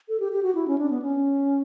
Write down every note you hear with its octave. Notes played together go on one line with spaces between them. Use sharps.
A4
G4
G4
F#4
E4
C#4
D4
B3
C#4